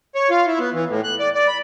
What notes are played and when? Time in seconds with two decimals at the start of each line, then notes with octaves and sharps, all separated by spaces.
0.15 C#5
0.30 F4
0.47 E4
0.59 B3
0.74 E3
0.89 A2
1.04 F#6
1.20 D5
1.35 D5
1.48 B5